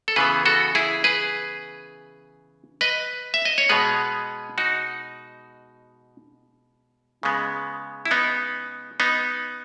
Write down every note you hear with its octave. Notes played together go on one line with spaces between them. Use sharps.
A4
C#3 E3 B3 G#4 B4
F#4 A4
E4 G#4
G#4 B4
B4 D#5
E5
D#5
C#5
B2 G#3 B3 G#4 B4
D#4 F#4
C#3 G#3 B3
E4
B3 D#4
B3 D#4